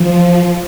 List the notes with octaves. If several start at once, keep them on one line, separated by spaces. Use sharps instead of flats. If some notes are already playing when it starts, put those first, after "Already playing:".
Already playing: F3